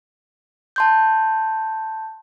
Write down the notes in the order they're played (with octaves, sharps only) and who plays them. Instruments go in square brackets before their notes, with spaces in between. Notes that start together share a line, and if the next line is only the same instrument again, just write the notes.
[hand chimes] A5 C6 G6